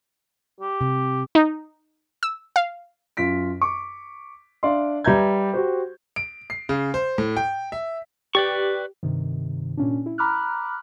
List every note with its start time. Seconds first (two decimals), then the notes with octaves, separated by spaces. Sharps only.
0.61 G4
0.81 C3
1.35 D#4
2.23 E6
2.56 F5
3.17 F#2 F4 B6 D7
3.61 C#6 D6
4.63 D4 D5 E5 F5 C6
5.04 G3 B4 E5 A#5 G6 G#6
5.54 F#4 G4 C5
6.16 D7
6.50 C7
6.69 C#3
6.94 C5
7.18 A2
7.37 G5
7.72 E5
8.35 G4 B4 D5 C#6
9.03 G2 C3 D#3
9.77 A#2 C#4 D4
10.06 E4
10.18 A#5 B5 D6 F6 F#6